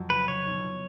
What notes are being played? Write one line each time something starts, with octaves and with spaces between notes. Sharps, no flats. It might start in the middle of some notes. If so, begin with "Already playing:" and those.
Already playing: F2 F#3
C#3 B4
C#3 C#5
B1